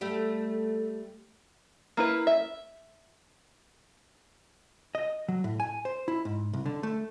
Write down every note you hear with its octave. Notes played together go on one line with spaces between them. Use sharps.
G3 A3
A#3 E4 B4
E5
D#5
F#3
A2
G#5
C5
E4
G#2
C2
D3
A3